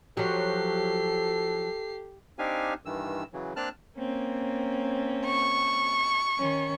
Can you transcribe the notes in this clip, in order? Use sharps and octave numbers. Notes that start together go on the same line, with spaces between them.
F3 F#3 G4 A4 C7
C4 D4 D#4 G4 F5 G#5
G2 D#3 E3 E6
C#3 E3 F#3
A#3 C4 D4 A5 F6 F#6
A#3 C4 C#4
C#6
D#3 C#4